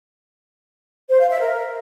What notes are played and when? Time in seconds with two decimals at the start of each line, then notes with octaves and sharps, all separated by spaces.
1.09 C5
1.20 F5
1.30 E5
1.40 A#4